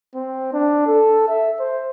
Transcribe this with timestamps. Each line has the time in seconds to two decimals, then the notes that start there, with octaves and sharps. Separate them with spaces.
0.15 C4
0.53 D4
0.87 A4
1.28 E5
1.60 C5